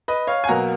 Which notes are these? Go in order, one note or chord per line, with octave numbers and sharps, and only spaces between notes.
B4 D#5
C#5 F5
G#5
B2 F#3 A#3 F#5 A#5